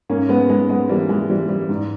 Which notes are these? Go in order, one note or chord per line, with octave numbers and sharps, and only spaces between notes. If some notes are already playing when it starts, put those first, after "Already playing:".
G#2 A#3 C#4
G#3 B3
G#2 G#3 B3
G#3 B3
E3 G3 A#3
E3 G#3
E3 G3
G3
G#2